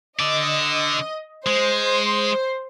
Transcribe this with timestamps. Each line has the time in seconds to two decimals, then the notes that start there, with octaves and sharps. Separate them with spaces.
0.20 D3 D5 D#5
1.47 G#3 C5